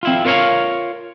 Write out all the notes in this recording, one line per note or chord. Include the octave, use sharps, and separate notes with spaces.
C4 E4 F4
F4 A#4 C5 C#5 F5